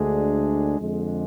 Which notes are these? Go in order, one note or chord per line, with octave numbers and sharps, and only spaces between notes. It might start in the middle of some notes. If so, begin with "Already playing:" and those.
Already playing: D2 D3 G#3 D4 G#4
F2 D3 G#3